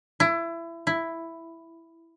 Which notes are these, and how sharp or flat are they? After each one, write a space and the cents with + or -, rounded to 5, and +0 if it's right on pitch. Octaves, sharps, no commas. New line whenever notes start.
E4 +25
E4 +5